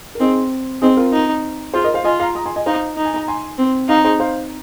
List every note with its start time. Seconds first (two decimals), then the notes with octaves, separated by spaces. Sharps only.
0.15 A#4
0.20 C4 D#4 G#4
0.82 C4 D#4 G#4
0.97 F4 A#4
1.12 D#4
1.74 F4 G#4 C5
1.84 A#4 D#5
1.94 C5 F5
2.04 F4 D#5 G#5
2.20 F5 A#5
2.35 A#5 D#6
2.46 G#5 C6
2.56 D#5 G#5
2.66 D#4 C5 F5
2.97 D#4
3.05 G#5
3.16 A#5
3.28 G#5 C6
3.58 C4
3.89 D#4 F5 A#5
4.05 G#4 C5
4.20 C5 F5